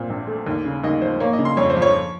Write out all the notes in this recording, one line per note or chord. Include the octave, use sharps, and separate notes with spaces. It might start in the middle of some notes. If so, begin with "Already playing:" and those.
Already playing: A#2 C4
A#1
A3
D#2
C#3
D#2 D#5
F3 C5
A#3 C#5
D#5
C#3
C6
F2 C#5
C5
F3
C#5